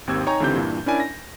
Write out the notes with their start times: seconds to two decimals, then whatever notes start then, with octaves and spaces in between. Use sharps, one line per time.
0.07 G#1 D#2 C4 G4 E6 G#6
0.27 D#4 C#5 G5 G#5 A#5 C#6
0.40 C#2 D3 E3 C4 G4 G6
0.55 G2 A#2 E3
0.86 C#4 D4 E4 A#4 D5 G#5
1.00 A#6